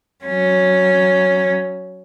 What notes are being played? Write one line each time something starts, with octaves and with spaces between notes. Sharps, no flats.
F#3 C#4